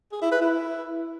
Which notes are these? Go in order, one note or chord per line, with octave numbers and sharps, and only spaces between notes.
G#4
E4
B4
E4